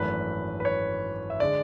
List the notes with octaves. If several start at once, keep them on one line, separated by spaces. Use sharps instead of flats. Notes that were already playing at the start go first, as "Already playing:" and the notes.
Already playing: G#1 F#2 E3 A3 D4 B4
B4
C#5
E5
D3 G#3 D5